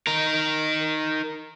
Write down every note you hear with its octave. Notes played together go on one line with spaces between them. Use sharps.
D#4 A#4